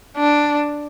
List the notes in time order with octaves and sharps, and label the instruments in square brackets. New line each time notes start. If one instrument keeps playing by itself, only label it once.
[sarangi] D4